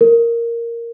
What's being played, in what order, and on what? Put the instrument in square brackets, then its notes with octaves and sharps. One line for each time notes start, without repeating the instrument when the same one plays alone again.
[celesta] A#4